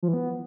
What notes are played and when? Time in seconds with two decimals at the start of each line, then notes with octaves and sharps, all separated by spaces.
0.03 F3
0.08 E3
0.14 B3